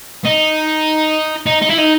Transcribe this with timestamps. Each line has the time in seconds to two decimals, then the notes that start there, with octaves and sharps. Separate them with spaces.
0.25 D#4
1.46 D#4
1.62 D#4
1.70 E4
1.78 D#4